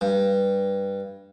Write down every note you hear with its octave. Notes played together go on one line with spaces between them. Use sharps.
G2